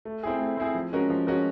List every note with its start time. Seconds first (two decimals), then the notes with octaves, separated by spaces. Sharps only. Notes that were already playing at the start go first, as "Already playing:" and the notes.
0.05 A3
0.23 C4 E4 G#4
0.40 A3
0.57 C4 E4 G#4
0.75 F3
0.93 G#3 C#4 F#4 A#4
1.10 F3
1.27 G#3 C#4 F#4 A#4